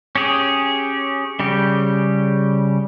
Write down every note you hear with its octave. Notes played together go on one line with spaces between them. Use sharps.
C#4 G4 G#4
C#3 G3 G4